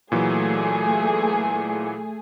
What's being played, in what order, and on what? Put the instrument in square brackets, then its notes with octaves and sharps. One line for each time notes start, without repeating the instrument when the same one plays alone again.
[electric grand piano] A#2 E3 F#3 [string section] A3 G#4